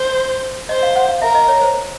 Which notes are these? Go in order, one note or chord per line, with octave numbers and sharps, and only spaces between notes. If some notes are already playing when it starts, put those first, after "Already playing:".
Already playing: C5
C5 D#5
F5
F#5
F5
A#4 E5
D#5
C#5
C5